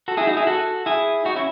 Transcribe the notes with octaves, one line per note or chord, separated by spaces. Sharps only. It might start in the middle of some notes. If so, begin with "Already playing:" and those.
F#4 A4
E4 G#4
D#4 F#4
E4 G#4
F#4 A4
E4 G#4
D#4 F#4
C#4 E4